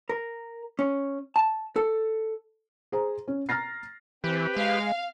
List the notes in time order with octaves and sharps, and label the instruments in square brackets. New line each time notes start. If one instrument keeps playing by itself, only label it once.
[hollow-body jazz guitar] A#4
C#4
A5
A4
[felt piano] G#4 C5 A#5
C#4
A#5 F6 A6 A#6 C7
[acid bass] E3 [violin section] C4 [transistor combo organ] G4 B4
[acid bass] G#3 [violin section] F5